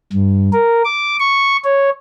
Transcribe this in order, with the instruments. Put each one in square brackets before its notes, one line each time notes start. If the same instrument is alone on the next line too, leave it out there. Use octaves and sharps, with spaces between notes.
[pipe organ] G2
A#4
D6
C#6
C#5